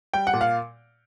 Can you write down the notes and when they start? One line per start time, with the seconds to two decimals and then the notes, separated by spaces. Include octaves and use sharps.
0.14 G3 G5
0.27 F#5
0.33 A#2
0.41 F5